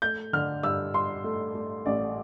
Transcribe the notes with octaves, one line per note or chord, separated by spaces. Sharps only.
A3 G6
D3 F6
G2 E6
G2 C6
A3
A3
A1 D5